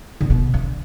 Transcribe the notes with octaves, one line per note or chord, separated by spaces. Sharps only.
D3
B2
D3